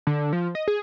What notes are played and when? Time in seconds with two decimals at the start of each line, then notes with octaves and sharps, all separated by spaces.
0.07 D3
0.33 F3
0.55 D#5
0.68 G#4